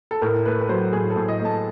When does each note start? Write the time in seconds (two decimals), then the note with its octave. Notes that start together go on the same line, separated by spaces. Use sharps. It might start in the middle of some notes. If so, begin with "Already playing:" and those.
0.11 A4
0.21 A2 A#4
0.45 A3 B4
0.61 B4
0.69 F#3 C5
0.93 A2 G#4
1.10 A4
1.16 A2
1.28 D#5
1.40 A3
1.45 A5